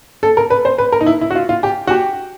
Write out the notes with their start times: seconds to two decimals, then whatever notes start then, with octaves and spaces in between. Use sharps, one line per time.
0.23 A4
0.37 A#4
0.50 B4
0.65 C5
0.78 B4
0.92 A#4
1.01 D#4
1.06 E4
1.21 E4
1.31 F#4
1.35 F4
1.49 F4
1.63 G4
1.87 F#4
1.91 G4